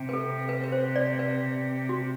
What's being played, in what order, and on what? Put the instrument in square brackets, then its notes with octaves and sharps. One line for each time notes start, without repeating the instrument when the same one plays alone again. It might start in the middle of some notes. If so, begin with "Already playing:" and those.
Already playing: [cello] C3
[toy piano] B4
A4
B4
B4
C5
D5
B4
F#4